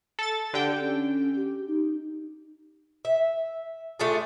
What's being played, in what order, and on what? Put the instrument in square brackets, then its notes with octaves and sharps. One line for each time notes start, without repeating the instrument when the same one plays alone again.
[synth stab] A4 A6
[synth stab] D3 G5 [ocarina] G4
[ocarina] C#4
G4
D#4
[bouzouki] E5
A3 D4 F4 G#4